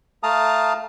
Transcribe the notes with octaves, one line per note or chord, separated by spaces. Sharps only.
A3 F5 A5 A#5 D#6